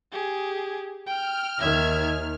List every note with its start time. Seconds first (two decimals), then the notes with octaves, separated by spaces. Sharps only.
0.12 G4 G#4
1.07 G5 F6
1.59 D#2 D#3 E5 G#6